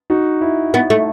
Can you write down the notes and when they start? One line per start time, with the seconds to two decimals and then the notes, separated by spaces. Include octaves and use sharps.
0.10 D#4 F#4
0.41 E4
0.74 B3
0.90 A3